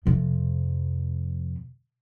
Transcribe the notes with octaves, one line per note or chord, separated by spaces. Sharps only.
F2 C3